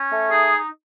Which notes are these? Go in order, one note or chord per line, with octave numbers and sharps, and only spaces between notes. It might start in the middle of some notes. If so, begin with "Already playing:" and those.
Already playing: C#4
A3
D#4 G#4